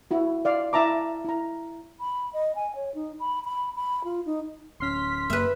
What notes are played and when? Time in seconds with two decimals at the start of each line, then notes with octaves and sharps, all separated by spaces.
0.11 E4 F#4
0.45 D5 F5
0.73 E4 E5 A5 A#5 D6
1.25 E4 A#5
1.98 B5
2.33 D#5
2.55 G#5
2.75 C#5
2.95 D#4
3.20 B5
3.45 B5
3.76 B5
4.04 F4
4.26 D#4
4.80 D1 C#4 C6 F6 B6
5.30 F#1 F#2 A#3 B4 E5